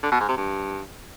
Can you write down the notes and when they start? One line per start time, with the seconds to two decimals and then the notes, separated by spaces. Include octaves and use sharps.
0.03 D3
0.11 B2
0.20 G#2
0.28 C3
0.37 G2